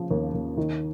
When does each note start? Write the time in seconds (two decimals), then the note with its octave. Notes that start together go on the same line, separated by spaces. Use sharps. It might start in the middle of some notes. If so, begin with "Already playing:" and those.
Already playing: C#3 F3
0.11 D#2
0.34 D#2
0.57 D#3